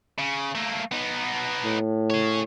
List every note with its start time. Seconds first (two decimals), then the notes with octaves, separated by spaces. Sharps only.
0.18 C#3
0.55 A3 A#3
0.92 B3 D#4
1.64 A2
2.10 G#4 C#5